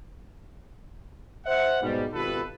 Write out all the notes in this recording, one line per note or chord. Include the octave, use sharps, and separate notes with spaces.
C5 E5 F#5
G#2 B2 G3
G#1 B2 F4 G4 A4 B4